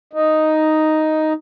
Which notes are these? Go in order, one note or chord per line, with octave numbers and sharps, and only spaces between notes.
D#4